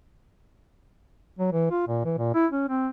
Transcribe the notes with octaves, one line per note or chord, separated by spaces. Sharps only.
F#3
E3
F4
A#2
E3
A#2
E4
C#4
C4